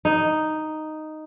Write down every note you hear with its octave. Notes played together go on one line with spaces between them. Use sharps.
D#4